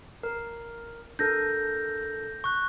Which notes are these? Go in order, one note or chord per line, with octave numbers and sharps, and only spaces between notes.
A#4
D4 A4 A#4 G6 A#6
C#6 F#6